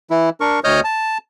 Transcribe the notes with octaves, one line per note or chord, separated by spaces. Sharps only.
E3 E4
D4 A#4 C#6
D2 C#5 D#5 D#6 F6 G6
A5